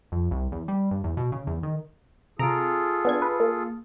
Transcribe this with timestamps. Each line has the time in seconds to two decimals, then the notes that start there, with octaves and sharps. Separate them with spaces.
0.12 F2
0.31 C2
0.52 E2
0.68 G3
0.91 G2
1.04 E2
1.17 B2
1.32 C#3
1.47 E2
1.63 D#3
2.39 C3 F4 G#4 A4 A#5 D7
3.05 B3 D4 G#6
3.22 B4
3.40 A#3